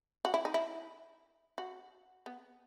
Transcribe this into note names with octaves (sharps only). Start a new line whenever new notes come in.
F#4
E4
D#4
E4
F#4
B3